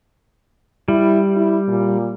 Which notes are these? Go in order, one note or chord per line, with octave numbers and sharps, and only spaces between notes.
G3 E4
E4
A#2